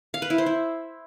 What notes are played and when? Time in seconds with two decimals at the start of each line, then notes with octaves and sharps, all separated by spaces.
0.14 F5
0.22 B4
0.30 E4
0.38 C5
0.46 E4